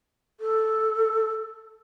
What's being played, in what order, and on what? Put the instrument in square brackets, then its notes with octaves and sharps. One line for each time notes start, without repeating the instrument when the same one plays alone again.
[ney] A4